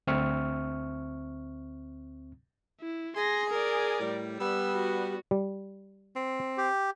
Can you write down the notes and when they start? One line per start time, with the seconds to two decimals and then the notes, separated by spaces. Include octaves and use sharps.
0.07 D2 C4 E5 C#6 F6
2.81 E4
3.17 G#4 C6 A#6
3.50 A#4 D5
4.00 A2 G3
4.40 G3 B3 E6
4.73 F#4
5.31 G3
6.16 C4
6.58 G4